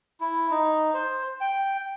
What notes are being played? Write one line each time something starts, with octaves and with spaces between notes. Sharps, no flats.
E4
D#4
C5
G5